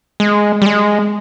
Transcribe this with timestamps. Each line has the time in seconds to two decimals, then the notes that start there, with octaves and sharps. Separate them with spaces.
0.20 G#3
0.62 G3
0.66 G#3